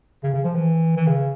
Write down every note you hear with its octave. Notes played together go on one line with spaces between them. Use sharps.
C#3
C#3
F3
E3
E3
C#3